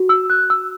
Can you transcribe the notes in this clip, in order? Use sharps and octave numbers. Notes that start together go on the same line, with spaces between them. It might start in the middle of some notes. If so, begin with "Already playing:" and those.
Already playing: F#4
E6
F#4 F#6
E6